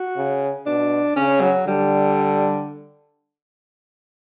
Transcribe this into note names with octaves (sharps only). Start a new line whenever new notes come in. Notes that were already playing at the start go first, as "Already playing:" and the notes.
Already playing: F#4
C#3
B2 D4
C#3 C#4
F#3
D3 G3